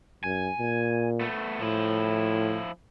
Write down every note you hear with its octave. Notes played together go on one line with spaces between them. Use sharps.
F#2 G#5
A#2
A3 B3
A2 F3 E4